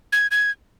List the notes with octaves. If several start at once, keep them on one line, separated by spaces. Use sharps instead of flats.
G#6
G#6